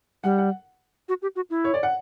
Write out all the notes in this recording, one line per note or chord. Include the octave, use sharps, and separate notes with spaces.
G3 F#5
F#5
F#4
G4
F#4
E4
C#5
D5
F#5